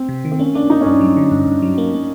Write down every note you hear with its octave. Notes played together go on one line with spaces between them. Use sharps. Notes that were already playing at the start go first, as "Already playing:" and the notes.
Already playing: C4
C3
D#3
C4
A#3 C#4
A#3 D4
A#3 D#4
C#4
G2 D4
F#3
D3
G2
G2
F#3
A#3
A#3